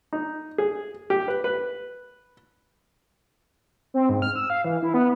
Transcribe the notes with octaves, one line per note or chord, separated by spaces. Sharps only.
D#4
G#4
G4
B4
B4
C4
G#2
F6
E6
F5
E3
E4
B3